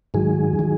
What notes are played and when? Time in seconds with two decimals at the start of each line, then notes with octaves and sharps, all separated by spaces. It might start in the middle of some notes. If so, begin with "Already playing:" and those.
0.14 G#2 D#3 F#3 G#4
0.59 D#3 F#3